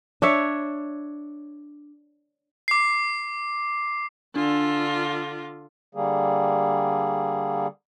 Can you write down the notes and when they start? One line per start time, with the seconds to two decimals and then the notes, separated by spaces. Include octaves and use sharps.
0.22 D4 C#5 E5
2.68 D6 C7
4.36 D3 D4 F4
5.95 D3 G3 A#3 G#4